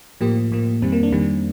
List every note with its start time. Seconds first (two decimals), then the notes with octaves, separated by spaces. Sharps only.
0.21 A2 F3 A#3 G4
0.52 A2 F3 A#3
0.82 F2 D#3 G3 C4
0.92 A#3
1.03 D4
1.12 F2 D#3 G3